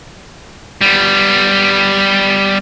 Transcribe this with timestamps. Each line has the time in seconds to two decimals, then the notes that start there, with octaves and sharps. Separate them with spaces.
0.81 G3 B3